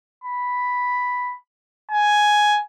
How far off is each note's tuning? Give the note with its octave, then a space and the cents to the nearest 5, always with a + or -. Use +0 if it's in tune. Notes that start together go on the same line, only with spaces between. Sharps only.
B5 +0
G#5 +5